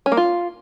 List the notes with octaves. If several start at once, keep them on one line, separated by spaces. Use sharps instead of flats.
C#4
A#3
F4